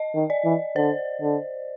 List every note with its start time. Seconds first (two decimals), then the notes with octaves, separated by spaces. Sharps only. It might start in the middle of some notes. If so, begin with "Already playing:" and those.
Already playing: D#5
0.15 D#3
0.30 D5
0.45 E3
0.76 D3 C5
1.22 D3